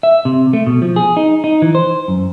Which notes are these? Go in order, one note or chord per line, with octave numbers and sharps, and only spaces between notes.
E5
C3
A3
B2
F3
G#4
D#4
D#4
E3
C5
F#2